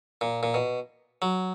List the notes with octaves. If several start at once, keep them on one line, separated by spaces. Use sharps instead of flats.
A#2
A#2
B2
F#3